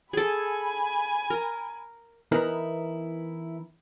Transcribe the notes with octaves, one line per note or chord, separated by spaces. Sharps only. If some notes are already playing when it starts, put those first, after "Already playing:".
G#4 A4 G#5 B5
A#4
E3 B3 D#4 E4 A#4 B4